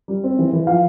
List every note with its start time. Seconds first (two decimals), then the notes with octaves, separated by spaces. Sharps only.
0.08 G3
0.24 C4
0.38 E3
0.53 E3
0.67 F3 F5